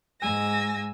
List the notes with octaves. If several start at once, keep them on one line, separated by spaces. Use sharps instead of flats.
G#2 G#3 G#5 E6 A#6